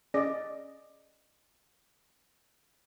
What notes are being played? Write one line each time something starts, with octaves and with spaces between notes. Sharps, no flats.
C#4 G#4 D5 D#5 A#6